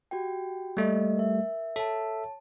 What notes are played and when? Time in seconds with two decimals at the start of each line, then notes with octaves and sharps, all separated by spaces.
0.11 F#4 G4 G5
0.77 G3 A3 A#3 D#5
1.16 A#4 E5
1.76 A4 C#5 E5 A5